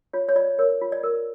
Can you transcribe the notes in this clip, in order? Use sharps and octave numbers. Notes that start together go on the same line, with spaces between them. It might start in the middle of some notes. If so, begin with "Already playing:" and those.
F4 C#5
C#5
F4 D5
A#4 C#5
F4
D5
A#4